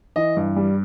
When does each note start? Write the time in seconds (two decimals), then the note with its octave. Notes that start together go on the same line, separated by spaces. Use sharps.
0.16 E3 D#5
0.37 G2
0.56 G3